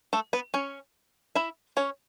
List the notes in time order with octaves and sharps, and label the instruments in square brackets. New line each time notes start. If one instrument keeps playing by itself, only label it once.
[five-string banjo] A3 A4
B3 B4
C#4 C#5
E4 E5
C#4 C#5